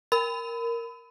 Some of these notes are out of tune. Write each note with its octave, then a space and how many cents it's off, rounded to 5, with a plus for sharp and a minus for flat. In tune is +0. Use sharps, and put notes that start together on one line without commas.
A#4 +0 B5 +30